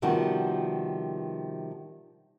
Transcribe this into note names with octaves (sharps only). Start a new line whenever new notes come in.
C3 D#3 F3 G3 B3 F#4